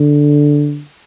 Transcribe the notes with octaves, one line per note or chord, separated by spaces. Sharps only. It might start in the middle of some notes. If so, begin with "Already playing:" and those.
Already playing: D3